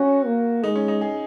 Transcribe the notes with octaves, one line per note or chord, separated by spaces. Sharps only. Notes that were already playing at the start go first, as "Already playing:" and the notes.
Already playing: C#4 F#4
A#3
G#3 D#4
C#4
D#4
G#4